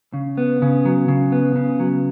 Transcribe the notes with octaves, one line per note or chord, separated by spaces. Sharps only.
C#3
B3
C#3
F#3
C#3
B3
C#3
F#3